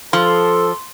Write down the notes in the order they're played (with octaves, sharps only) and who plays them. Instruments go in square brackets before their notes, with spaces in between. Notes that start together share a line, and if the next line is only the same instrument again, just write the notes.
[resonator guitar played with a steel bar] F3 [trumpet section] A4 [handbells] C6